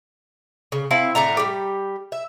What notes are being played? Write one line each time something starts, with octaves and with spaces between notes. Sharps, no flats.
C#3
C4 E4 F5 A5
A2 D3 A3 A#5
G3 G4
E5